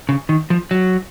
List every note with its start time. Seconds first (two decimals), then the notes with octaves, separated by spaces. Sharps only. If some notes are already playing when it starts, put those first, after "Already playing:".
0.09 C#3
0.29 D#3
0.50 F3
0.71 F#3